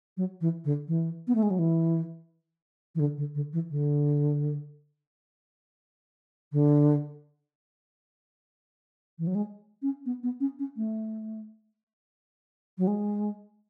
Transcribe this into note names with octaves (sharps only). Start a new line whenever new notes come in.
F#3
E3
D3
E3
B3
A3
G#3
F#3
E3
E3
D3
D3
D3
E3
D3
D3
E3
F#3
G#3
C#4
B3
B3
C#4
C#4
A3
F#3
G#3